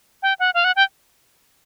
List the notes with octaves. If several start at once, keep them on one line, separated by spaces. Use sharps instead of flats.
G5
F#5
F5
F#5
G5